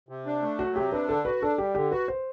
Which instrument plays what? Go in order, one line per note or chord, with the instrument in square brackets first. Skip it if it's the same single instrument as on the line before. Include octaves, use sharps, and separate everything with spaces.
[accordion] C3
D4
A3
[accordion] F#3 [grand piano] F#4
[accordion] C3 [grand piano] G4
[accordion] D4 [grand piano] B4
[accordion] D3 [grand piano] A4
[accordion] F#4 [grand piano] B4
[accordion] D4 [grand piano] A4
[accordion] G3 [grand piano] G4
[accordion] D3 [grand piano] G4
[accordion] F#4 [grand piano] B4
[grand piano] C5